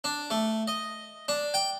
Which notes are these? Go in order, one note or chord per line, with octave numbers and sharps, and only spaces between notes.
D4
A3
D#5
D4
G5